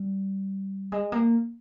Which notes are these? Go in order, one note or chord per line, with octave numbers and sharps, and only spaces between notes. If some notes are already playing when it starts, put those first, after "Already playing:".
Already playing: G3
G#3
A#3